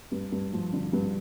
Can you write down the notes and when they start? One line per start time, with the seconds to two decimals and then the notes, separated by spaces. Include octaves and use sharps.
0.12 G2
0.32 G2
0.53 F3
0.73 D3
0.93 G2